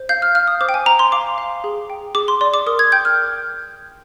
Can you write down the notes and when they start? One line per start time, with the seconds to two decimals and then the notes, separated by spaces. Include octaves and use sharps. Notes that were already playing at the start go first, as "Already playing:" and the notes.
Already playing: C5
0.09 F5 G6
0.22 F6
0.35 F5 F6
0.47 D#6
0.61 C5 D6
0.69 G5
0.74 G#5
0.86 C5 A#5
0.99 C6
1.12 F5 D6
1.38 F5
1.64 G#4
1.90 G5
2.15 G#4 D6
2.28 C6
2.41 D5 C6
2.54 D6
2.66 A#4 D#6
2.79 G#6
2.92 G5 G6
3.05 F6